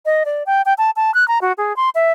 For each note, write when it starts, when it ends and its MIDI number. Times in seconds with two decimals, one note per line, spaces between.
0.06 0.23 75
0.25 0.43 74
0.46 0.62 79
0.66 0.74 79
0.78 0.91 81
0.96 1.14 81
1.14 1.27 90
1.28 1.39 82
1.41 1.52 66
1.58 1.75 68
1.76 1.90 84
1.95 2.12 76